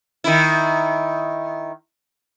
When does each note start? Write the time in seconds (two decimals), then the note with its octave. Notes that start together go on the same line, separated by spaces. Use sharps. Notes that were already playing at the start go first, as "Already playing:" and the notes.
0.24 D#3 E4